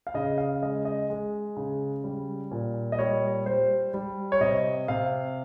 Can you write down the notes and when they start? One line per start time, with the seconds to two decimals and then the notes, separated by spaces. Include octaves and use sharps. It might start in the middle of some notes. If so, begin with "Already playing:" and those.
0.07 F5
0.14 C#3 D#5
0.38 F5
0.62 G#3 D#5
0.85 D#5
1.10 G#3
1.57 C#3
2.04 G3
2.51 A#2
2.92 D#5
2.99 G3 C#5
3.46 G3 C5
3.94 G3
4.32 C#5
4.41 C3 D#5
4.88 C3 F5